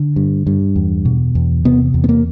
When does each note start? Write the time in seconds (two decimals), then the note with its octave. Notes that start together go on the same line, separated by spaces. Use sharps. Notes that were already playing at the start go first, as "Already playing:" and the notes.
Already playing: D3
0.16 G2
0.47 G2
0.76 E2
1.05 B2
1.35 E2
1.65 C3 B3
1.94 E2
2.04 B3
2.09 A#3